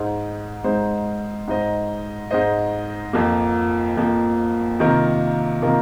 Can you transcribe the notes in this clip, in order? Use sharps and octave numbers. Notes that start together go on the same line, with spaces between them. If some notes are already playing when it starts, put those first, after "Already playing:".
Already playing: G#2 G#3 D#4 C5
G#2 G#3 D#4 C5
G#2 G#3 D#4 C5 D#5
G#2 G#3 D#4 C5 D#5
F2 F3 A#3
F2 F3 A#3
C3 D#3 A#3 F4 A#4
C3 D#3 A#3 F4 A#4